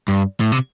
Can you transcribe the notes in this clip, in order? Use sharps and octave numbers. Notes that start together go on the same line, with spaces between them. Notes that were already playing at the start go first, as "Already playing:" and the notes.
G2
A2
C3